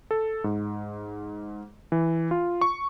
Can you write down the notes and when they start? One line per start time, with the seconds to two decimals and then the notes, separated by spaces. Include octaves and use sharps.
0.11 A4
0.44 G#2
1.92 E3
2.31 F4
2.61 C#6